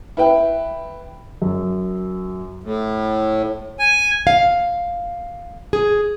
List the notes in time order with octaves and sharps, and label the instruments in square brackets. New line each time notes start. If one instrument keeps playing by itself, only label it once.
[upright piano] E4 B4 G5
F#2
[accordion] A2
G#5
[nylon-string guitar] F5
G#4